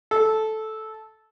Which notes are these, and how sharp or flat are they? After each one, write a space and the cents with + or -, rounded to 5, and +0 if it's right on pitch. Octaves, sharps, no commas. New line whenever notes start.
A4 -10